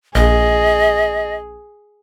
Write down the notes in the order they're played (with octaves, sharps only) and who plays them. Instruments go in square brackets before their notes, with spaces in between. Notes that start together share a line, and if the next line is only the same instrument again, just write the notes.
[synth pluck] A#1 [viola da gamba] G#4 [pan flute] D#5